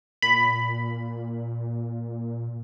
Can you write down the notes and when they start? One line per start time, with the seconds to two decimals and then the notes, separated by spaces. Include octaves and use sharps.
0.22 A#2 B5